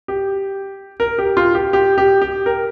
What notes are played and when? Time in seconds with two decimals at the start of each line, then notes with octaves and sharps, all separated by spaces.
0.08 G4
1.00 A#4
1.18 G4
1.37 F4
1.55 G4
1.73 G4
1.98 G4
2.22 G4
2.46 A#4